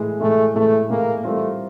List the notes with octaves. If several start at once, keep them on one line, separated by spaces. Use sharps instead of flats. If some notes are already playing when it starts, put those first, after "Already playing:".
Already playing: A2 E3 G#3
A2 E3 G#3 A3
A2 E3 G#3 A3
A2 E3 G#3 A#3
E3 G3 A3 C4 F4 A#4